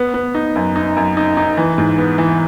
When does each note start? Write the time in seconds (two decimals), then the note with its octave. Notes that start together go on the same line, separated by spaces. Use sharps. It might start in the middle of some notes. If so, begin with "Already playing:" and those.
Already playing: B3
0.14 B3
0.34 D#4
0.56 F#2
0.76 D#4
0.97 F#2
1.17 D#4
1.37 D#4
1.57 E3
1.78 G#2
1.98 B3
2.18 E3